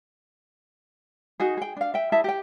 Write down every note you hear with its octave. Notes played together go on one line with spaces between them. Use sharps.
D#4 F#4 G#4
G#4 G5
D4 F5
E5 G5
E4 G#4 E5 A5
G4 G5